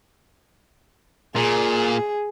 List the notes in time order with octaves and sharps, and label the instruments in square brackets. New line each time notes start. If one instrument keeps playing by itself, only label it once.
[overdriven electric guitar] A#2 [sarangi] G#4